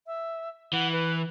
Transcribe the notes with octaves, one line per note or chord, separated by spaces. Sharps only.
E5
E3 F#5
B4